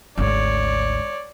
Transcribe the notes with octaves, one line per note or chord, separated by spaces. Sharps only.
G#1 D2 C#5 D5